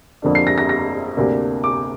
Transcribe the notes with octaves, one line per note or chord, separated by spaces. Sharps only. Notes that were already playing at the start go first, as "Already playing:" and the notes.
F2 D3 A#3 D4
C7
A#6
A#6
A#6
D2 C3 A#3 D4
D6